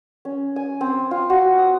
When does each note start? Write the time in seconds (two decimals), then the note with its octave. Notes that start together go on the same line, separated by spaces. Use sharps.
0.25 C#4
0.56 G#5
0.81 C4
1.11 F4
1.30 F#4
1.58 D#6